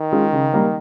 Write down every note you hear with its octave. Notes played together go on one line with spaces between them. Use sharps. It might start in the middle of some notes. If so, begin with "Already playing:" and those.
Already playing: D#3
G#3 C#4 F4
C#3
G3 A#3